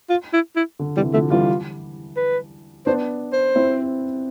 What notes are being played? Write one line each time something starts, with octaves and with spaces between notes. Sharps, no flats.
F4
E4
E4
D3
C3 E3 G3
D3 F3 A3
E3 G3 F4
B4
B3 D4 C5
C5
C4 E4